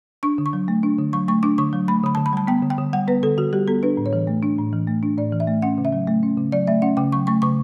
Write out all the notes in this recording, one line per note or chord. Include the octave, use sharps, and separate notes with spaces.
D4 C#6
D3
C#6
F#3
A3
D4
D3
F#3 C#6
A3 C#6
D4 D6
D3 C#6
F#3
A3 B5
D3 B5
D3 A5
B5
G3 A5
B3 G5
D3
G5
D3
G3 F#5
B3 B4
D3 A4
D3 F#4
G3 G4
B3 A4
D4 B4
A2
C#5
E3
A3
D4
A2
E3
A3
D4
A2 D5
E3
E5
A3
C#4 F#5
C#3
E5
F#3
A3
C#4
C#3
F#3 D5
A3 E5
C#4 F#5
C#3 G5
F#3 C#6
A3 C#6
C#3 C#6